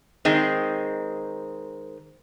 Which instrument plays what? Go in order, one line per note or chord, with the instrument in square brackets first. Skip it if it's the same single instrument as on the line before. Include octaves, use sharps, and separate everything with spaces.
[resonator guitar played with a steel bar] D#3 G#3 C4